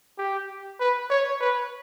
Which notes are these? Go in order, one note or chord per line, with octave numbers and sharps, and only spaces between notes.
G4
B4
C#5
B4